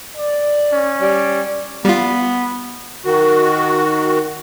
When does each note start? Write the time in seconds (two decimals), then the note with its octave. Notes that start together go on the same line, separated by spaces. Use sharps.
0.17 D5
0.72 C#4
1.01 G3 D5
1.85 G3 B3 F4
3.05 D#3 F#4